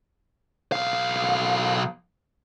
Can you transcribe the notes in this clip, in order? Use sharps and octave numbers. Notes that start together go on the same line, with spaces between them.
B1 F5